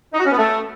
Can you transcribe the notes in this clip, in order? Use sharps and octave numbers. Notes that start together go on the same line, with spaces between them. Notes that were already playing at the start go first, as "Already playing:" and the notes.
D#4
F#4
C#4
B3
A3